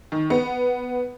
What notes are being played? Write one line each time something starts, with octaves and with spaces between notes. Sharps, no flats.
D#3
B3